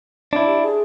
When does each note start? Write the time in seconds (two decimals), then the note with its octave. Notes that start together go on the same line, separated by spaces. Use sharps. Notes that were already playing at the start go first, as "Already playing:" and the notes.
0.33 D4 E4
0.47 G4
0.63 G#4